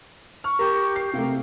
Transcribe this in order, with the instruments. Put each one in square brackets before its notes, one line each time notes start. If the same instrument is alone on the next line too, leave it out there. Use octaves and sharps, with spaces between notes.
[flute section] C#6 [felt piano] F6
[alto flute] G4 [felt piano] A#4
[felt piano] C7
[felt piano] C3 A3 [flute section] A#4 F5 [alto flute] G5